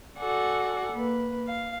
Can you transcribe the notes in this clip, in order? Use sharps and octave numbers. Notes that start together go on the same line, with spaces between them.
F#4 A4 D5 F#5 G#5
A#3 B4
F5